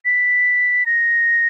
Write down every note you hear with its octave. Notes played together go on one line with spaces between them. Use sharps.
B6
A#6